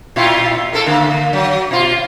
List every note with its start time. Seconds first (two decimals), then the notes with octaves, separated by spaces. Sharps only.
0.16 A#2 E4 F4
0.73 A#3 A4 A#4
0.86 D3 A#3
1.33 F#3
1.71 B2 F4